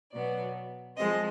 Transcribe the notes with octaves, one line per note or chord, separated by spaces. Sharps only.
B2 F#3 B3 D5
F3 G#3 C4 D#5